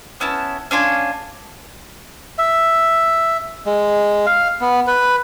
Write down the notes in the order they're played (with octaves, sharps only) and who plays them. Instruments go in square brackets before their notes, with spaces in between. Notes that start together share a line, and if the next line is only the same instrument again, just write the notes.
[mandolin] B3 C#4 E4 A5
C#4 D4 F4 G#5
[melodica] E5
G#3
F5
B3
B4